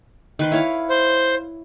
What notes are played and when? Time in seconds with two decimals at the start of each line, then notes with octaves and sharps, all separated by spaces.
0.39 D#3 B4 C6
0.52 E4 C#5 F5
0.90 C5